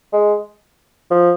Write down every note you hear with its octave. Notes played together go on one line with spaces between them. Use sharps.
G#3
F3